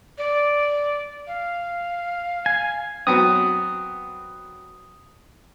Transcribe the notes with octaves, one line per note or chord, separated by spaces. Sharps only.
D5
F5
G#5
F#3 B3 C4 D#6